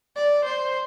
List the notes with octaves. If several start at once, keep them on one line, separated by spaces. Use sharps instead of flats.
D5
C5